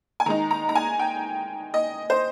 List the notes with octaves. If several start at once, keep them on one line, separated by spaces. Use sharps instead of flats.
G#5
D#3 G#3 D#4 A#5
A#5
A#5
G#5
G5
D#5
C5